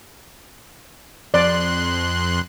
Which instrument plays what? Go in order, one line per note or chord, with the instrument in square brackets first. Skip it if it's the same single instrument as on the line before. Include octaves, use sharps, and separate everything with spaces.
[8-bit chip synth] F2 C6 F#6 [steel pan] D5